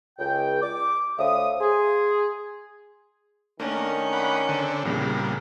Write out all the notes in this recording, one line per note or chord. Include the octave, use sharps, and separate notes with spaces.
C#2 G5
D6
D2 C5 C#5 E5 F5 D#6
G#4 C6
D#3 A3 A#3 C#4 D4
D5 F#5 B5
D3 C4 D4
A#1 E2 C#3 G3 A#3